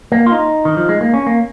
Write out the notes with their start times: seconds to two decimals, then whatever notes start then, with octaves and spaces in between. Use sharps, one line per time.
0.12 A#3
0.26 F4
0.32 D#4
0.65 D#3
0.77 F3
0.89 G#3
1.01 A#3
1.14 C#4
1.27 A#3